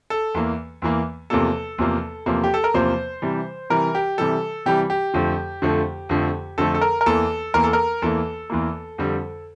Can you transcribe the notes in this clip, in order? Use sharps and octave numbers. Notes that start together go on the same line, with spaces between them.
A4
E2 E3 A#3
E2 E3 A#3
E2 C3 F3 A#3 A4
E2 C3 F3 A#3
E2 C3 F3 A#3
G4
A4
A#4
E2 C3 F3 A#3 C5
C3 E3 G3
C3 E3 G3 A#4
G4
C3 E3 G3 A4
C3 E3 G3 G4
G4
F2 D3 F3 A3
F2 D3 F3 A3
F2 D3 F3 A3
F2 D3 F3 A3 A4
A4
A#4
A#4
E2 E3 A#3 A4
E2 E3 A#3 A#4
A4
A#4
E2 E3 A#3 A4
E2 E3 A#3
F2 D3 G3